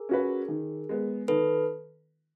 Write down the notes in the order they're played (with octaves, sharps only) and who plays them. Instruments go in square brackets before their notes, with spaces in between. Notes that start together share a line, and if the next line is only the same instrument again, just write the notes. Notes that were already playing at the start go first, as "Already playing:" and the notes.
Already playing: [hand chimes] G#4 A#4
[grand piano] C#4 F#4 B4
D#3
G#3 B3
[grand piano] D#3 [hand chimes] A4 B4